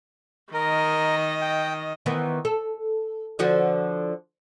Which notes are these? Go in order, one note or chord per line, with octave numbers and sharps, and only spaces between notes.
D#3 A#4 D#5
G5
D#3 E3 B3
A4
D3 F3 F#4